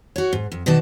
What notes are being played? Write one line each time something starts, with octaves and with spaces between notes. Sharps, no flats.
F#4 C#5
G#2
F2
B2 D#3 F#4 D5 A5